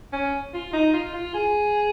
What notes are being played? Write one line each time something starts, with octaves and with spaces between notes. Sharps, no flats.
C#4
F4
D#4
F4
F4
G#4